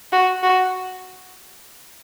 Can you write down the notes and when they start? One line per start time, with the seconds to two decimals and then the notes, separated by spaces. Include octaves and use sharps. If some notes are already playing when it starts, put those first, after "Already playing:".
0.12 F#4
0.43 F#4